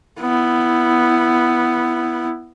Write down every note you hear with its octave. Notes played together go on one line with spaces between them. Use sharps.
B3 E4